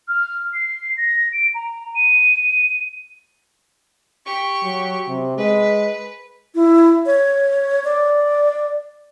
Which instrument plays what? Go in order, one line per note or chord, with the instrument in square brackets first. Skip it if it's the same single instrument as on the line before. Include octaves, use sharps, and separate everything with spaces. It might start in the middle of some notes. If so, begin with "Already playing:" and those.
[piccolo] F6
C7
A#6
D7
A#5
D#7
[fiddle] G4 C#6
[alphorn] F#3
C3
[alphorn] G#3 [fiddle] B4
[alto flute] E4
C#5
D5